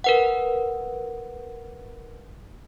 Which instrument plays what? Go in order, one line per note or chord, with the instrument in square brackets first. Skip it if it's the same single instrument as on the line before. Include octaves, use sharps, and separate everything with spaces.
[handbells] A#4 B4 F#5